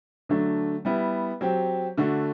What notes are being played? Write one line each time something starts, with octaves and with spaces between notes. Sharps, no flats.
D3 F#3 A3 D4
G3 B3 E4
F#3 C4 G4
D3 A3 D4 F#4